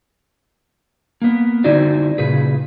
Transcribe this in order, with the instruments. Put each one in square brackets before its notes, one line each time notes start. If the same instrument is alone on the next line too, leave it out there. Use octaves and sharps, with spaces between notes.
[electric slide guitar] A#3 B3
D3 C4 D#4 E4 F#4 D5
A#2 C#3 G#4 B4